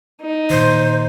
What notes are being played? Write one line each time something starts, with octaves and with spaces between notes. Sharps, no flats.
D#4
A#2 D#3 C5